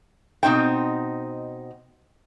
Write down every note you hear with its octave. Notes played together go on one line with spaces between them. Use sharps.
B2 C4 D#4 C5 G5